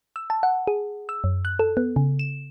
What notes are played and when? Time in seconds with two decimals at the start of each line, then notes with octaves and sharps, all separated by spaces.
0.16 E6
0.30 A5
0.43 F#5
0.67 G#4
1.09 E6
1.24 F#2
1.45 F#6
1.59 A4
1.77 B3
1.96 C#3
2.19 E7